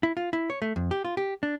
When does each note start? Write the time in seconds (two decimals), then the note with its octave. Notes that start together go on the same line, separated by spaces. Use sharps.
0.03 E4
0.17 F4
0.33 E4
0.50 C#5
0.62 A3
0.76 F2
0.91 G4
1.05 F4
1.17 G4
1.43 D4